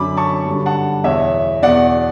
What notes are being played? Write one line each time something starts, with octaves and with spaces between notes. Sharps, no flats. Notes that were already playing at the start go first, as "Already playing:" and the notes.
Already playing: F#2 D3 B5 D6
A5 C#6
G2 D3
F#5 A5
E2 B2 C#5 E5
E2 B2 D5 F#5